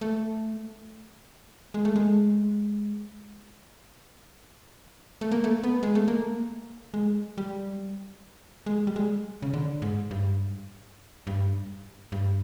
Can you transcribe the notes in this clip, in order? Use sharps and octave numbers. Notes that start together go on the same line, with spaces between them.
A3
G#3
A3
G#3
A3
A#3
A3
B3
G#3
A3
A#3
G#3
G3
G#3
G3
G#3
C#3
D3
G#2
G2
G2
G2